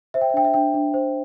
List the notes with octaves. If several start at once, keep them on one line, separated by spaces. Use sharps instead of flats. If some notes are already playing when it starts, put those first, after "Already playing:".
C5 E5
G5
E5
D4 G5
E5
D4 G5
D4
C5